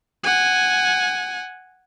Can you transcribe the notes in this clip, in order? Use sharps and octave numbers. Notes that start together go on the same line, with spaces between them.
F#5 G#5